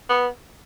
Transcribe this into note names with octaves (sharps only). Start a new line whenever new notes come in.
B3